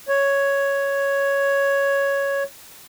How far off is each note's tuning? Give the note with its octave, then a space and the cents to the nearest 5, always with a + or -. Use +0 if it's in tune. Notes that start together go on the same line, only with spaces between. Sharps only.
C#5 +5